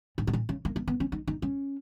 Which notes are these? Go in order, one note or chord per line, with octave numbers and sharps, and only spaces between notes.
G#2
B2
A#2
C#3
A#3
A#3
B3
C#4
D#4
D#4
C#4